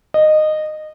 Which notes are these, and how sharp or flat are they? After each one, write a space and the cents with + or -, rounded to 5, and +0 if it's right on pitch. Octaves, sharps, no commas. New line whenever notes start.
D#5 -15